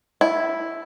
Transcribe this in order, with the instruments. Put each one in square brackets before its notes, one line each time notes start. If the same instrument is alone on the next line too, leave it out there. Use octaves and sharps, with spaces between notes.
[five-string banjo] E4